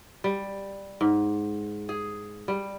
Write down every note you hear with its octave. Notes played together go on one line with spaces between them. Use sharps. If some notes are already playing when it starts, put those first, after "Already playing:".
G3
G#2
G#4
G3